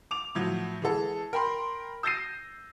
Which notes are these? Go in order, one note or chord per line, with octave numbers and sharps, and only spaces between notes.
D6 F7
A2 F3 F#3
E3 G#3 A4
A#4 G5 B5 C6
E6 G6 A6 A#6 C7 D#7